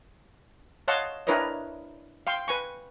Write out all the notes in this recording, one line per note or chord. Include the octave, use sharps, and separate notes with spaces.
C#5 D#5 F5 F#5 A5 C6
D4 E4 A#4 B4 C#5 D#5
F5 G5 C6
B4 G#5 C#6